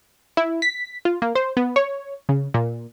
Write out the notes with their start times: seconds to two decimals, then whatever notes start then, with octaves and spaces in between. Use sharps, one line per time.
0.37 E4
0.62 B6
1.05 F4
1.22 A#3
1.35 C5
1.57 B3
1.76 C#5
2.29 C#3
2.54 A#2